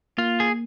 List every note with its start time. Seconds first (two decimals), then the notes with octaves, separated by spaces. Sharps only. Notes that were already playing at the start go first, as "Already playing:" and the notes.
0.18 A#3 F4
0.40 G#4